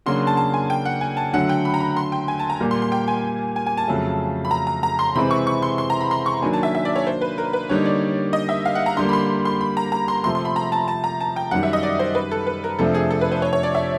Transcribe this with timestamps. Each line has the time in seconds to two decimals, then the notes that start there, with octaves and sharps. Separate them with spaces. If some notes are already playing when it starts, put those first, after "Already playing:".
0.06 C#3 F#3 A#3 D4 F#4 C6
0.27 A5
0.37 A5
0.54 G#5
0.70 G5
0.85 F#5
1.01 G#5
1.17 A5
1.33 D3 F#3 A3 F#5
1.49 G5
1.65 B5
1.74 A#5
1.80 B5
1.97 C6
2.12 G5
2.28 G#5
2.39 A5
2.50 A#5
2.60 A#2 G3 A#3
2.71 C6
2.82 C6
2.92 G5
3.08 G#5
3.56 G#5
3.66 G#5
3.77 A5
3.88 F2 C#3 F#3 A3
4.45 B5
4.51 A#5
4.67 A#5
4.83 A#5
4.99 C6
5.15 C3 E3 G#3 C4 B5
5.31 C#6
5.47 C#6
5.63 C6
5.78 C6
5.90 A#5
6.01 B5
6.11 C6
6.26 C#6
6.42 D#3 F#3 A#3 D4 G#5
6.53 A5
6.63 E5
6.75 E5
6.85 D5
6.96 C#5
7.07 C5
7.21 B4
7.38 A#4
7.53 B4
7.69 D3 G3 A#3 D#4 C#5
7.86 D5
8.33 D#5
8.49 E5
8.65 F5
8.75 F#5
8.86 A#5
8.97 D3 G3 A#3 C6
9.09 B5
9.13 C6
9.45 C6
9.61 B5
9.77 A#5
9.92 A#5
10.08 C6
10.24 C3 F3 A3 C6
10.35 C6
10.45 B5
10.56 A#5
10.72 A5
10.88 A5
11.04 A#5
11.20 A5
11.36 G5
11.51 F#2 D#3 G3 F#5
11.63 E5
11.73 D#5
11.83 D5
11.99 C5
12.15 B4
12.31 A4
12.47 B4
12.64 A#4
12.79 F2 C3 F3 A3 D4 A4
12.95 G#4
13.10 A4
13.21 B4
13.31 C5
13.42 C#5
13.53 C#5
13.63 D5
13.75 E5